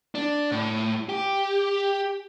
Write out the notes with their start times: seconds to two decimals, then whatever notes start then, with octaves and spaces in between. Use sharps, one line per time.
0.15 D4
0.51 A2
1.09 G4